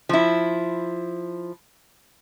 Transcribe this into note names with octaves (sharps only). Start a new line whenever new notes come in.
F3 E4